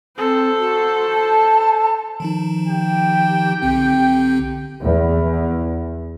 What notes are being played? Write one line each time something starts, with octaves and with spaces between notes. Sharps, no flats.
C4 A4 C5
F#4
A5
D#3 F3 D#4
G4 G5
B1 D3 C4
E2